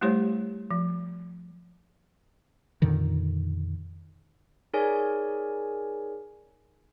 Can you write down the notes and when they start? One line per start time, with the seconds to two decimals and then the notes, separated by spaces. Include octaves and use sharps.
0.01 G3 A3 E4 G4 C5 C#5
0.71 F3
2.82 F2 A#2 D3 D#3
4.73 D#4 G#4 A#4 C#5 D5 G#5